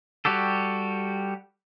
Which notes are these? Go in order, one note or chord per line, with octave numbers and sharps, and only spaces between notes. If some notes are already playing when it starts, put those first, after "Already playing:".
G3 F#4 G4 A4